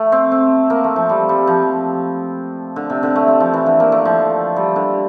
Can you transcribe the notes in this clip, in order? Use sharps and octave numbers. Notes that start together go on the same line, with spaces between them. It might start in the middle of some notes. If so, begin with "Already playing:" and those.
Already playing: A3
C4
C4
A#3
A3
F3
G3
G3
F3
D3
C3
D3
A3
C4
F3
E3
D3
A#3
A3
F3
G3
D3